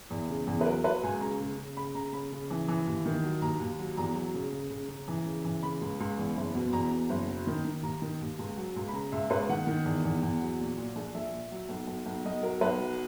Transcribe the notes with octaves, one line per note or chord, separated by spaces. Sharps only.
E2
C#3
E2
B4
F#3 A#4
F#3 B4
C#2 G#5
C#3 A#5
C#3
C#3
C#3 B5
C#3 A#5
C#3 B5
C#3
E3
E3
D#2
D#3
F#3
D#2 A#5
D#2
F#3
E2 A#5
F#3
C#3
C#3
C#3
C#3
E3
C#3
E3
C#3 B5
C#2
C#2
E2
F#1
B2
E2 A#5
B2
F#1
F#3
D#3
D#3
D#2 A#5
D#3
D#2
C#2
F#3
C#2
B5
C#3 A#5
C#2 E5
C#2 B4
D#3 F#5
D#3
E2
E2
E2
F#3
A#2
A#2
A#1
A#1 E5
A#2
F#3
B1
B1
B1
B1 D#5
F#3 A#4
B1 B4
F#3